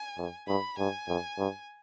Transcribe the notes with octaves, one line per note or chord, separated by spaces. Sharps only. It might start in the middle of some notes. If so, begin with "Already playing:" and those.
Already playing: G#5
F2
G2 B5
G2 G#5
F2
G2